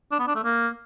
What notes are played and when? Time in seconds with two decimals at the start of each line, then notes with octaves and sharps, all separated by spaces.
0.11 D4
0.19 B3
0.27 D4
0.35 A3
0.43 A#3